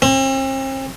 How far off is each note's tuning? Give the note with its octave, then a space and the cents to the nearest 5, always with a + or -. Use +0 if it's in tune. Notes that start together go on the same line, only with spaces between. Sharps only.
C4 +40